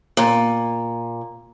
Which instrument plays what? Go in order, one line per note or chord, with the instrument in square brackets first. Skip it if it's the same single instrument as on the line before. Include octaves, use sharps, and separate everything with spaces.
[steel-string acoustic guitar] A#2